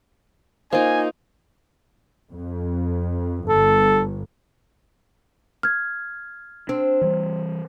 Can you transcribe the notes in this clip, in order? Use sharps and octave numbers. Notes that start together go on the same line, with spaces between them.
A#3 D#4 F4 C5 G#5
F2
G1 A4
F6 G#6
C4 D4
E3 G3